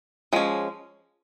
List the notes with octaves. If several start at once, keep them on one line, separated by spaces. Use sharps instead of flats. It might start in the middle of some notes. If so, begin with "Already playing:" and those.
F3 G#3 C#4